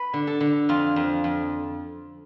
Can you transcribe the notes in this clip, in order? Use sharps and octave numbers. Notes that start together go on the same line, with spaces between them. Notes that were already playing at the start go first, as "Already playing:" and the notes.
Already playing: B4
D3
A4
D3
F2 F4
F2
F2